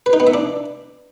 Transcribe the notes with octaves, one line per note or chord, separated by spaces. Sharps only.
B4
D#4
B3
E5
D4